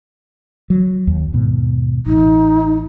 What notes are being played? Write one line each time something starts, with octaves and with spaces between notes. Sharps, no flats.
F#3
D#2
D#2 G#2 B2
A1 D#4